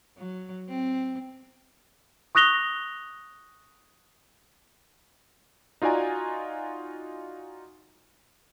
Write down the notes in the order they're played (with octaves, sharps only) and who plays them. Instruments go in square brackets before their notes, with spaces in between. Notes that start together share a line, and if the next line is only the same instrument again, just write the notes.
[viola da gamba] F#3
C4
[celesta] C#6 D#6 F#6 A#6 F7 G7
[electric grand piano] D#4 F4 F#4 D5 G#5 A#5